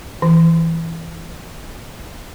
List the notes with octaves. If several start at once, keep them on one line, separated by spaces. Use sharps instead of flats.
E3